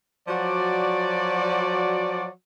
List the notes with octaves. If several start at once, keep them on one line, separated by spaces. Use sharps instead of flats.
F3 F#3 F#4 D5